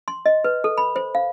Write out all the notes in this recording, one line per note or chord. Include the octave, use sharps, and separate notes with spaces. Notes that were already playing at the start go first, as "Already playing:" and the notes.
C6
D#5
B4
A4
B5
C5
F5